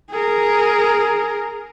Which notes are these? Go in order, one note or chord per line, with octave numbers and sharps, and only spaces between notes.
G#4 A#4